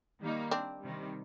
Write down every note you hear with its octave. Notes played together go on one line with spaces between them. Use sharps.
D#3 G3 A#3 D#4
C4 D4
C3 D#3 G3